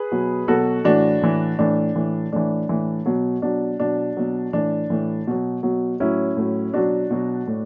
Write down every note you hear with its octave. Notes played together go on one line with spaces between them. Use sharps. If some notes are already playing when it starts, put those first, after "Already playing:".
Already playing: G#4 B4
B2 F#3
B2 F#3 F#4 A4
A2 E3 D4 F#4
A2 E3
A2 E3 D4
A2 E3
A2 E3 D4
A2 E3
B2 F#3
B2 F#3 D4
B2 F#3 D4
B2 F#3
A2 E3 D4
A2 E3
B2 F#3
B2 F#3
A2 F#3 C#4 E4
A2 F#3
B2 F#3 D4 F#4
B2 F#3
A2